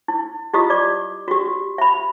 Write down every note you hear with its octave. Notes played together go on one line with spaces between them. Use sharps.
E4
E4 F4 G4 D#5 D#6
D5 D6
F#4 G4
E5 B5